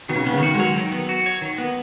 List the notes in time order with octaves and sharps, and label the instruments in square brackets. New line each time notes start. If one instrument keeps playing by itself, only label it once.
[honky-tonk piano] B2 [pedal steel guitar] D#3
[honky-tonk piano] C#3
[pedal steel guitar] B3
[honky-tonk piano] C#3
D#3
[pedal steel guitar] F#4
[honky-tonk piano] G#3
[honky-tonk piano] F#3 [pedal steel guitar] C#5
[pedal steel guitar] D#3
B3
F#4
C#5
D#3
B3